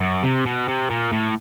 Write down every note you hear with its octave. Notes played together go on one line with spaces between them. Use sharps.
F#2
C3
B2
C3
A#2
A2